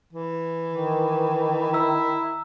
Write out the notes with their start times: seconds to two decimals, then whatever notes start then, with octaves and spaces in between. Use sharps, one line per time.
0.13 E3
0.70 D#3
1.73 E4 A#5 E6